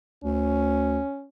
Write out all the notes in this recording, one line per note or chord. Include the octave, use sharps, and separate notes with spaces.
D2 C#4